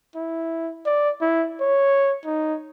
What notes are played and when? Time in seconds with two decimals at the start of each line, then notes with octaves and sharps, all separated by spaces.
0.16 E4
0.86 D5
1.21 E4
1.61 C#5
2.25 D#4